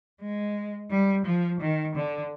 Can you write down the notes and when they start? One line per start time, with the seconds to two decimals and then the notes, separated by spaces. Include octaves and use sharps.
0.21 G#3
0.90 G3
1.26 F3
1.61 D#3
1.96 D3